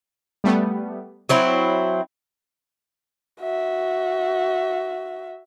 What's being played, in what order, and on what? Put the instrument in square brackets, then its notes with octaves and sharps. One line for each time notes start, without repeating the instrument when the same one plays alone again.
[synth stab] G3 A3 B3
[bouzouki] F#3 C4 E4 [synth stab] C#5
[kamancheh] F#4 E5